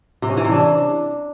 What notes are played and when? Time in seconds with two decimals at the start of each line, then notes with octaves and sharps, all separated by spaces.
0.22 C3
0.30 C#4
0.37 E3
0.44 C3
0.52 D4